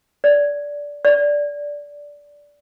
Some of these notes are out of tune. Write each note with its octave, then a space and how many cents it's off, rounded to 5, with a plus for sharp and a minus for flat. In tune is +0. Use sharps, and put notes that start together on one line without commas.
D5 -15
D5 -10